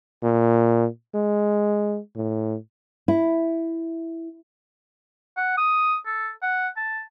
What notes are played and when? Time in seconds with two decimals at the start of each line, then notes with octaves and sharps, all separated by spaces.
0.23 A#2
1.14 G#3
2.16 A2
3.08 E4
5.37 F#5
5.58 D#6
6.06 A4
6.42 F#5
6.77 A5